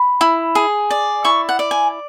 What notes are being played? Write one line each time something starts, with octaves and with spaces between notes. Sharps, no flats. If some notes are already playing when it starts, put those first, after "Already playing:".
Already playing: B5
E4
G#4
D5
E4 C#6
F#5
D5
G#5